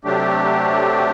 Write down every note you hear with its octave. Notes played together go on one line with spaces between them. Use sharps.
C3 F#3 A3 D4 G4